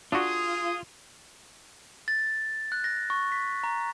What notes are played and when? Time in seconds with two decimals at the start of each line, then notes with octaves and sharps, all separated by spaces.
0.12 D4 F4 F#4 G#4 D#6
2.08 A6
2.72 F#6
2.84 A#6
3.10 C#6
3.32 B6
3.64 A#5